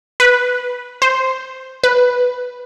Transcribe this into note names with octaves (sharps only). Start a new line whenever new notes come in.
B4
C5
B4